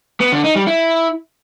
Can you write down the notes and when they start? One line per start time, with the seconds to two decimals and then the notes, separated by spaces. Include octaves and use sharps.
0.20 B3
0.32 D3
0.44 D#4
0.55 G3
0.67 E4